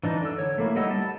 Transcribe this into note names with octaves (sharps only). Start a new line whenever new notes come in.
E3 D4 D#4
D3 E6
C#5
A3 A#3 E4
G3 D#4 D#5 F#5 E6
A5